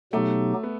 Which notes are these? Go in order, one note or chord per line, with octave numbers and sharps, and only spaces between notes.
B2 F#3 A3 B3 D#4 G4
B3